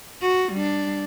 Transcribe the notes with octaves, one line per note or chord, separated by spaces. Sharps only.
F#4
G3 D4